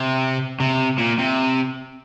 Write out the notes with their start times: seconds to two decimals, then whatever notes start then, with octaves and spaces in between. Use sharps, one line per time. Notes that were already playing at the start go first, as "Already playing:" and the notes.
Already playing: C3
0.60 C3
0.98 A#2
1.19 C3